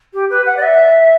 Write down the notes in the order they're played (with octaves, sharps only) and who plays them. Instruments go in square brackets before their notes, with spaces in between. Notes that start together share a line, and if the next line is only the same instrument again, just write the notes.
[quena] G4
B4
F#5
D5
E5